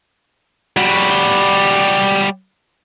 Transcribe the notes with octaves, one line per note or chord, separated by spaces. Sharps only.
G3 F#4